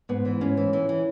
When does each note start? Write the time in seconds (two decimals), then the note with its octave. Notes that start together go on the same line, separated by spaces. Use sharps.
0.09 G#2 B3
0.25 E3
0.41 G#2 C#4
0.57 E3
0.73 E3
0.89 E3